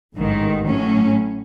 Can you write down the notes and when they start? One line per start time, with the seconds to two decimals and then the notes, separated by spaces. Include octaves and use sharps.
0.15 A1 G#2 D#3
0.67 A2 F#3 C#4